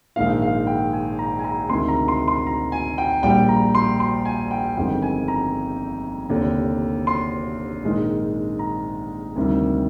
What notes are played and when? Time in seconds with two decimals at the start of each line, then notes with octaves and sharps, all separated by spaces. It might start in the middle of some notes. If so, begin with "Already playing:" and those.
0.16 A#1 G#2 D#3 F5
0.42 F5
0.67 G5
0.93 G#5
1.19 A#5
1.39 G#5
1.44 A#5
1.69 D2 C3 D#3 G#3 C6
1.88 A#5
2.08 C6
2.28 C6
2.47 A#5
2.72 G#5
2.98 G5
3.23 A#1 A#2 G3 G5
3.49 A#5
3.75 C6
4.00 C6
4.25 G#5
4.51 G5
4.76 G1 F2 D#3 G#3 G5
5.02 G#5
5.28 A#5
6.29 F1 D#2 D3
7.07 C6
7.83 A#1 G#2 D#3 G#3
8.59 A#5
9.36 D2 C3 D#3 G3